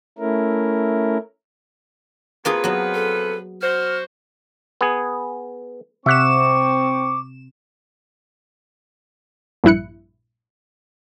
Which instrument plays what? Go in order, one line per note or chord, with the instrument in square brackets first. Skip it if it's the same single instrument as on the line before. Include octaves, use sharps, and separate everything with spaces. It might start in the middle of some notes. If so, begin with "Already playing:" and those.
[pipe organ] A3 C#4 E4 A#4
[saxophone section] C3 F3 B4 [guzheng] A#3 F4 G#4
[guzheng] F#3 B3
[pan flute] A4
[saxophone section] F#4 C5 [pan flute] F6
[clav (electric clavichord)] B3 G#4
[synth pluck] C3 E7 [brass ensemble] C4 [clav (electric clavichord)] E5 F#5 [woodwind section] C#6 D6
[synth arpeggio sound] A#1 G2 E4 F#6 C#7